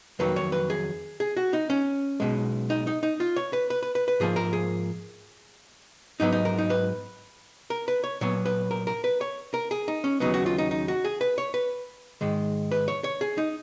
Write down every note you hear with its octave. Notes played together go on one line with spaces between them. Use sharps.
F2 D#3 F#3 A#3 B4
C#5
B4
G#4
G#4
F#4
D#4
C#4
B1 B2 G#3
D#4
D#4
D#4
F4
C#5
B4
B4
B4
B4
B4
G#2 F3 A#3 G#4
A#4
G#4
G#2 F#3 B3 D#4
D#4
A#4
D#4
B4
A#4
B4
C#5
A#2 F#3 B3 C#5
B4
A#4
A#4
B4
C#5
A#4
G#4
D#4
C#4
D#2 C#3 F#3 B3 D#4
F#4
F4
D#4
D#4
F#4
G#4
B4
C#5
B4
G#2 D#3 G#3
B4
C#5
C#5
G#4
D#4